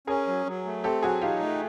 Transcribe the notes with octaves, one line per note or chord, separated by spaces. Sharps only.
C#4 G#4 A#4
F#3
F#3
A3
C4 G4 A4
F#3 F#4 G#4
D#4 F4 G4
A3